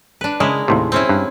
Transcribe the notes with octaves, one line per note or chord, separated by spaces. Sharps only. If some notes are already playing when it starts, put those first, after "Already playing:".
D4 B4
C#3 G#3 E4 A#4
D#2 A2 C3
C4 C#4 E4
G2